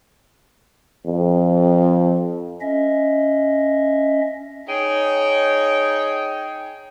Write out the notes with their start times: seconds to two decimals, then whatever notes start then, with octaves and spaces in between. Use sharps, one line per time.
1.07 F2
2.61 C#4 D#5 E5
4.69 D#4 G#4 C#5 G5